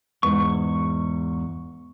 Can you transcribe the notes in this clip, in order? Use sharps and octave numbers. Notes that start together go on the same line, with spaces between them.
E2 G#2 C#6